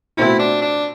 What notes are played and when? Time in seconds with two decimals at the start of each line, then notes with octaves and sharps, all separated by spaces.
0.17 B2 A3 C4 E4 F4
0.39 D4
0.62 D4